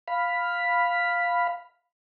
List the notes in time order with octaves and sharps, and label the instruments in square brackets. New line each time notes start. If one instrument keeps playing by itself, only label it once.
[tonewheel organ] F5 B5